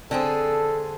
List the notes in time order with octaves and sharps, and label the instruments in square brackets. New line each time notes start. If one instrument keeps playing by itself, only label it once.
[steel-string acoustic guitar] D3 C4 G#4 [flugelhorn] A4